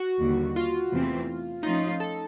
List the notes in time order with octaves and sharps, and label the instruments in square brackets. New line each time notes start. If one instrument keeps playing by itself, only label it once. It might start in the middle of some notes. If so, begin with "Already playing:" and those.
Already playing: [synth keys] F#4
[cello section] D#2 D3 G3
[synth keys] F4
[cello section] E2 C3 E3 A3 C4
[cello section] F3 A3 C#4 F4 [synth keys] D#4
[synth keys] A4